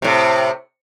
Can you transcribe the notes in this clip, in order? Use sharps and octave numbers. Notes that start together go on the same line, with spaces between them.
A2 C3